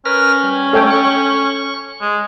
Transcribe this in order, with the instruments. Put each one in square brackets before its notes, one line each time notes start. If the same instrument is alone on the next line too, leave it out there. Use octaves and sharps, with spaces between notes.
[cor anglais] C#4 [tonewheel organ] A#4 B4 F6
[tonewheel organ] G3
[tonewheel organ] G#3 A3 [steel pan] A4 C#5 G5
[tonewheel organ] C#6
[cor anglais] G#3